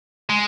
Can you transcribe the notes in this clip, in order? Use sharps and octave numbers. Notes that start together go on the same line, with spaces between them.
G#3